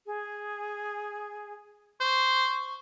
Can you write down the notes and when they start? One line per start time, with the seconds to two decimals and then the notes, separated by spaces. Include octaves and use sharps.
0.06 G#4
2.00 C5 C#6